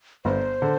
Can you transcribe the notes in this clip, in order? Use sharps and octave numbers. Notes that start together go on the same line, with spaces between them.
G1 C5
D3